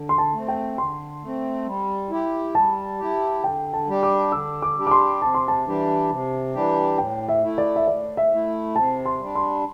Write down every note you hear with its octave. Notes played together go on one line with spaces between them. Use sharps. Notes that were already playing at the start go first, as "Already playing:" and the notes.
Already playing: D3
C6
A5
A3 C4
G5
D3 C6
A3 C4
G3
E4 G4
G3 A5
E4 G4
D3 G5
A5
G3 D4 G4
D6
D3 E6
D6
G3 D4 G4
D6
C6
C3 A5
C6
A5
E3 G3 D4 G4
C3
E3 G3 D4 G4
A2 G5
E5
A3 E4
D5
E5
A2 D5
E5
A3 E4
C3 A5
C6
G3 D4
C6